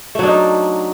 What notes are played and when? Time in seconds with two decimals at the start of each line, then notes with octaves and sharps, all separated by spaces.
0.15 A3
0.19 F#3
0.23 D4
0.27 D#4